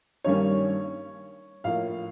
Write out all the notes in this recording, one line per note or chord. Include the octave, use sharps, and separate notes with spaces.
G2 D#3 G3 A#3 C#4 C#5
A2 F3 A#3 F5